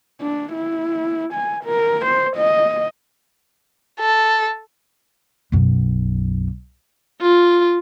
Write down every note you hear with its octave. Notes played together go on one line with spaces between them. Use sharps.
D4
E4
G#5
A#4
C5
D#5
A4
B1 F#2
F4